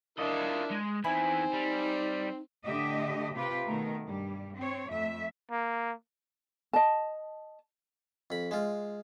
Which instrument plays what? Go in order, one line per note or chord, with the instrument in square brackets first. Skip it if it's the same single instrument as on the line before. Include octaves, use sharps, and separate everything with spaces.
[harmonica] D4 E4 A#4 [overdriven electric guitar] F4 D#5
[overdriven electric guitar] G#3
[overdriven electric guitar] E2 E4 [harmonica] C4 [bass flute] D#4 [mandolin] G#5 B5
[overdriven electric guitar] G3
[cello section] A2 D3 A3 G4 D#5 E5
C3 F4 G4 B4
B2 D#3 A3 A#4
G2 G3
C4 C#5
F2 A3 E5
[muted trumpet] A#3
[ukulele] D#5 A5
[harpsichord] F2 B5
G#3 F4